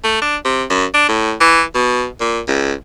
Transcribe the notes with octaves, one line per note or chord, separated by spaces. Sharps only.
A3
D4
C3
F#2
D4
A2
E3
B2
A#2
C#2